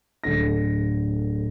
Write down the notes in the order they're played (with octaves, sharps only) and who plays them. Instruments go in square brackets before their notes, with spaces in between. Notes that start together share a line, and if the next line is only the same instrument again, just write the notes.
[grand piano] D1 D3 A#6